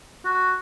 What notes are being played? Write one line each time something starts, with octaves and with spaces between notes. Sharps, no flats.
F#4